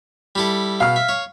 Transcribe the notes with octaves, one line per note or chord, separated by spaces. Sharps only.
G3 E4 A4
B2 F5 F6
E5
C#5